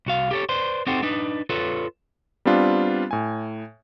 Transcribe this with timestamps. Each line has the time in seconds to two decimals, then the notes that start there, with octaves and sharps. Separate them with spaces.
0.06 C2 F#4 F5
0.31 G4 A4 C#5
0.49 B4 C5 D5 C6
0.87 C4 D#4 F#4 G4 A4 C5
1.03 D4 D#4 B4
1.50 F4 A4 B4 C#5
2.45 G3 B3 C4 D4 F4
3.11 A2 G#5